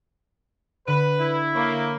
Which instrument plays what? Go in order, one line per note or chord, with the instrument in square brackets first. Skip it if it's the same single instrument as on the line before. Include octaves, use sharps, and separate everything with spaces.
[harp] D3 [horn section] B4
[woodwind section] E4
[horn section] A#3 [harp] C#5 B5